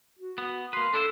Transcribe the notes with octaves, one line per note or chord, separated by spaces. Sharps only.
F#4
B3
A#3 B4 C6
D4 E4 A4 C5